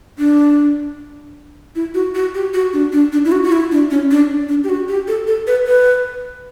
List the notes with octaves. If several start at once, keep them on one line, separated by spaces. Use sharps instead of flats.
D4
E4
F#4
F#4
G4
F#4
D4
D4
D4
E4
F#4
F#4
E4
D4
C#4
D4
D4
G4
F#4
G4
A4
A4
B4
B4